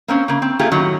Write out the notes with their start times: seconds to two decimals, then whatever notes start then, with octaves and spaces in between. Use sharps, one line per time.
0.08 A#3 C4 C#4
0.28 C#3 A#3
0.42 C4
0.59 A3 A#3 F4 G4 G#4
0.72 F#2 A2 D#3 F#3